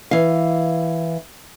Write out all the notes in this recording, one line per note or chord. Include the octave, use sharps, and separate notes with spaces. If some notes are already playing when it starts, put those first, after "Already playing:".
E3 F5